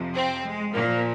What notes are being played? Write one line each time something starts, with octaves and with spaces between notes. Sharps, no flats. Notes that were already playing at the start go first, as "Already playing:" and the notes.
Already playing: F2 C3 F3
C4
G#3
A#2 F3 A#3